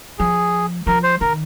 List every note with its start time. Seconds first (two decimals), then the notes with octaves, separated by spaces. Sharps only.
0.19 F3 G#4
0.87 F3 A#4
1.03 C5
1.21 D#3 A#4